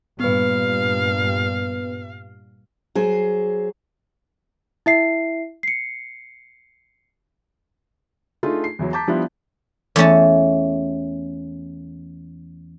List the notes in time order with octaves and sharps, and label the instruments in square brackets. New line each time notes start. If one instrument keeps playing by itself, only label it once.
[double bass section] G2 A#2 G3 [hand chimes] B3 B4 [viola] F5
[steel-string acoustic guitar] F#3 G#4 C5
[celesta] E4 E5 C7
C7 C#7
[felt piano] A3 D4 D#4 F4 G#4
C7
E2 E3 F#3
A5 A#5 D6 G6 B6
F3 G3 B3 D4 E4 F4
[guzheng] E2 A3 C#4 A5